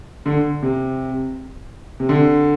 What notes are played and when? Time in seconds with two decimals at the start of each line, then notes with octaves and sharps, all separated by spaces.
0.26 D3
0.63 C3
2.00 C3
2.09 D3